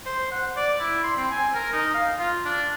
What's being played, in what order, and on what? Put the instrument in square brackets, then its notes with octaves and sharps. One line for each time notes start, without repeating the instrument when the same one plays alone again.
[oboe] C5
F#5
D5
E4
C6
C4
G#5
A#4
D#4
F5
F4
D4